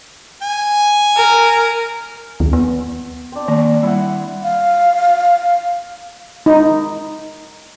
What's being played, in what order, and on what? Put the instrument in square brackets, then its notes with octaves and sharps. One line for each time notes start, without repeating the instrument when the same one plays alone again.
[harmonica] G#5
[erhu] A#4
[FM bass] D#2
B3
[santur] C4 D4
[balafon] D#3 A#3
[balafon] G3 [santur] E4 F#5
[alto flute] F5
[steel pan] D#4